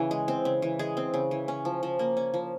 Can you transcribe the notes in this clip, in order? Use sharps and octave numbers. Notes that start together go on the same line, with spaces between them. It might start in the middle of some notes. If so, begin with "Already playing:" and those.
Already playing: C#3 E3
G#3
C4
C#3
E3
G#3 G#4
C4
C#3
E3
C#4
F3
F3
A#3
C#4
F3